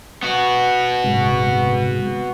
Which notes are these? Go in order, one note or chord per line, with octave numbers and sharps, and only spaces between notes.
B3 F#4
D#1 G#2 C3 G#3